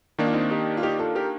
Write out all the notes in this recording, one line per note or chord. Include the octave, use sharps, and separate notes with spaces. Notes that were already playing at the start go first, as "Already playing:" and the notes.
D#3 A#3 D4 D#4
F4
C4 D#4
D#4 G4
F4
D#4 G4
F4 A4
G4 A#4